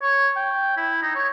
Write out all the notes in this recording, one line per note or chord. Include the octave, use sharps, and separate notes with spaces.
C#5
G5
E4
D#4
C#5